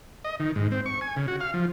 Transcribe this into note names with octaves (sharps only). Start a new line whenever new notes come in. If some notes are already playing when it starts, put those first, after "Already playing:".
D#5
D#3
G#2
C4
C#6
G#5
C#3
F#4
F5
F3